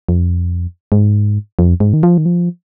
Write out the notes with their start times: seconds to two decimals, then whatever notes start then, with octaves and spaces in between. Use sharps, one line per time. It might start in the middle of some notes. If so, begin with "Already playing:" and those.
0.09 F2
0.92 G#2
1.59 F2
1.80 G#2
1.93 D#3
2.03 F3
2.18 D#3
2.26 F3